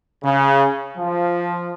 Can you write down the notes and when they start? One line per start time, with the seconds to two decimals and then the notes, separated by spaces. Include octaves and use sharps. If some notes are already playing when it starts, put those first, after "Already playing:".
0.24 C#3
0.98 F3